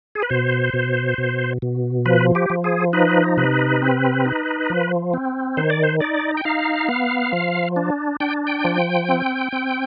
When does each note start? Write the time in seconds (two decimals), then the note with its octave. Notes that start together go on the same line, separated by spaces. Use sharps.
0.15 G#4
0.22 B4
0.30 B2 C5
0.74 B2
1.18 B2
1.62 B2
2.05 F3 B4
2.35 G4
2.50 F3
2.64 G#4
2.93 D#4 B4
3.37 C3 B4
3.82 C4
4.26 D#4
4.70 F3
5.14 C4
5.57 D#3 C5
5.70 D5
5.83 C5
6.00 D#4 D5
6.37 G5
6.45 D#4 F5
6.88 B3
7.32 F3
7.76 D4
8.20 D4 G5
8.47 G5
8.64 F3
9.09 C4
9.52 C4